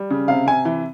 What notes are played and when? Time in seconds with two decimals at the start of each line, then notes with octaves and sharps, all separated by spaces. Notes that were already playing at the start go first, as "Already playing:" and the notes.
Already playing: G3
0.11 C#3
0.28 C3 F5
0.46 C3 G#5
0.65 E3